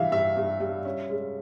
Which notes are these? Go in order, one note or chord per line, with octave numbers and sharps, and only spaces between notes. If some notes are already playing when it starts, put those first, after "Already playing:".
Already playing: G2 E3 G3 E5 F5
G2 E5
G2
G3
C#4
G#3